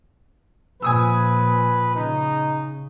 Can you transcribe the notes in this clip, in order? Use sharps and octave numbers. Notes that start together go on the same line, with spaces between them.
A#2 F3 B4 G#5 D#6 E6
C#3 D#4